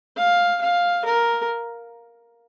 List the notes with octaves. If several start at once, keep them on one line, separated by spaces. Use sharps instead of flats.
F5
F5
A#4